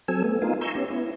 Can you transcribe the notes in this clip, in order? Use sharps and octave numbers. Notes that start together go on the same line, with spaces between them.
F#3 C4 A4 G#5 E6
A3 B3
B3 D#4 F4 A#4 F5 G#5
G#5 A#5 C6 C#6 E6 G6
B3 C#4 G4
B3 E4